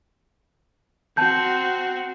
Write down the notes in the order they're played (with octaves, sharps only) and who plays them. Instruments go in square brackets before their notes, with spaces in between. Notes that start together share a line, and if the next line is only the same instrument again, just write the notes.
[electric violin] C4 F#4 [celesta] A5 G6